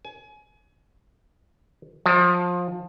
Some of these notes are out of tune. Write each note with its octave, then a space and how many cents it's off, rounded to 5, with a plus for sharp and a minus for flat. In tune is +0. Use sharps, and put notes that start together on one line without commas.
G#5 +30
F3 +25